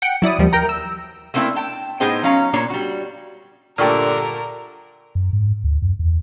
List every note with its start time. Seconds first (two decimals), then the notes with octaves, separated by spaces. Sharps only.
0.02 F#5 G5 C#7
0.22 F#3 E4 D5 D#6
0.39 D#2 F3 G3
0.53 A#4 G5 A#5
0.69 E6
1.34 A3 A#3 C4 D4 E4
1.56 G5 A5
2.00 A2 B3 D#4 G#4 C5 G5
2.23 F#3 C#4 F5 A#5
2.53 A#2 A#3 D4 C#5
2.70 G3 F#4
3.78 G2 A#2 D3 A3 A#4 G5 C#6 F6
5.15 F#2
5.33 G#2
5.64 D2
5.82 F#2
5.99 E2